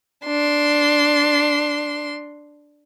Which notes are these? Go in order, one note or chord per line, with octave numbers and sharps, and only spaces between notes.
D4 C6